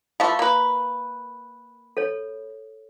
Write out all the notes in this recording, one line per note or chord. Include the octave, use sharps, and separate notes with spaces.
E3 F3 A3 F5
A#3 B4
A4 C#5